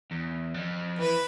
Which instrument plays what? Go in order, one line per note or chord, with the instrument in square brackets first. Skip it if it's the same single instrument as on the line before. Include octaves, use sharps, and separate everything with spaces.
[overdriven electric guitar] E2
F2
[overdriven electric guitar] E3 [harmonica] B4